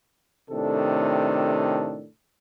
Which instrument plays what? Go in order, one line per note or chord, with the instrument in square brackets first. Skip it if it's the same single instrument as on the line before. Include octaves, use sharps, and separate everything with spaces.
[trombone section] A2 C3 D#3 D4 A4